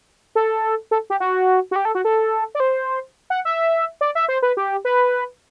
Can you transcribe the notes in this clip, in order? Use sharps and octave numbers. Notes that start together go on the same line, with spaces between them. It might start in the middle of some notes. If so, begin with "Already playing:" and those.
A4
A4
G4
F#4
F#4
G4
A4
F#4
A4
D5
C5
F#5
E5
D5
E5
C5
B4
G4
B4